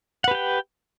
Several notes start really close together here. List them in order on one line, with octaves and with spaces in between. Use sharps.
F#5 B4 G4 G5